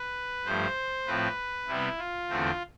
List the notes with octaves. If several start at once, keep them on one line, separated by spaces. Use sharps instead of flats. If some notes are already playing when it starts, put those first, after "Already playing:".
Already playing: B4
G2 F3 A3 C5
A2 F3 C4 B4
C3 G3 B3 E4
F4
E2 D3 A3 C4